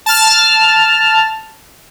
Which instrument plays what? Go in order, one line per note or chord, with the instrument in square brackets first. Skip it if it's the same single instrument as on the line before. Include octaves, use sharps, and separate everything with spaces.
[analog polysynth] A5 F6